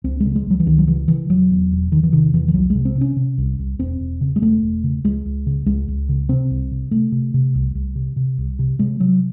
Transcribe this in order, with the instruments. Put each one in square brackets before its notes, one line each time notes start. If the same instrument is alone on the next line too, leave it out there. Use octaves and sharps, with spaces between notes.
[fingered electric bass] C#2 C4
G#3
C#3
G#3
C#2 F#3
E3
C#2 D#3
F#3
C#3 E3
C#3 E3
E1 F#3
E2
E1
E1 D#3
E3
C3 D#3
E2 E3
E3
C2 F#3
C3 G#3
C4
C3
C#4
C3
C2
C2
E1 C4
E1
C#3
G#3
E1 A3
E1
C#3
C#2 G#3
C#2
C#3
C#2 G#3
C#2
C#3
C3 C4
C2
C3
C3 A3
C3
C3
C2
C2
C3
C3
C2
C3
C3 G#3
C3 F#3